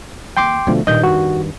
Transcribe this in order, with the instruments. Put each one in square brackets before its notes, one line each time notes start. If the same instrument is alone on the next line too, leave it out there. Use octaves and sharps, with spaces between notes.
[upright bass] D#3 A#3 [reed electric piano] G5 C6 D6
[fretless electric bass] B2 D3 F3 [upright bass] A3
[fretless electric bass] G2 D#3 [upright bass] A#2 [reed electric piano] D#5 G6
[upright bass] F2 [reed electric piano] F#4